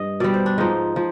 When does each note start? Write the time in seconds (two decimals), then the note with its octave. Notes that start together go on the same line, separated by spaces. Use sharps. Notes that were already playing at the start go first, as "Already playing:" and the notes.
Already playing: G2 D#5
0.20 B2 G3 D5
0.34 C5
0.46 D4
0.58 G#2 F3 D#4
0.96 F3